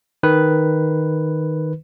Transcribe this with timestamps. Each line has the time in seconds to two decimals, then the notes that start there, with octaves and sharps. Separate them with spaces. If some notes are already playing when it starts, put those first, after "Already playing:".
0.23 D#3 B4